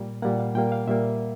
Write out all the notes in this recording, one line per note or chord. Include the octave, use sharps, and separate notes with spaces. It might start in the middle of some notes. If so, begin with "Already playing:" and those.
Already playing: A#2 G3 A#3
A#2 G3 A#3 F#5
F5
A#2 G3 A#3 G5
F5
A#2 G3 A#3 E5